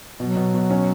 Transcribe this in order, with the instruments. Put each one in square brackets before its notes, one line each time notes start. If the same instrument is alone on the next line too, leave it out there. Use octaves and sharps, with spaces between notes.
[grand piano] B2 [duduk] F#3
[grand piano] B2
B2
C#4